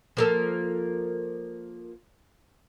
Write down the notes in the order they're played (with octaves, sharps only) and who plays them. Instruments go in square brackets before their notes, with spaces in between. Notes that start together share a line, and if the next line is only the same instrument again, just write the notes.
[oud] F3 A#3 A4